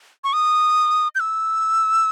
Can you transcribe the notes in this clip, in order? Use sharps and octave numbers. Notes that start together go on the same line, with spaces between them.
C#6
D#6
G6
E6